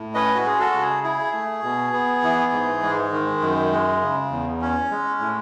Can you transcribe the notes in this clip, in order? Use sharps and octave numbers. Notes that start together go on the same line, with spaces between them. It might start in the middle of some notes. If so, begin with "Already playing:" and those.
Already playing: A2
C#4 B4 D#5
F#4
G#3 G#4
F#4 A4
C#3
G#4
E4 G#4
A3
B2
B3
E3
G#2
G#3
D#3
F#2
G#3
C#3
E2
C#4
G#3
A2